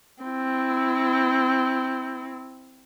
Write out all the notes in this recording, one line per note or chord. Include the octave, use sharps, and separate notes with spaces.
C4 E4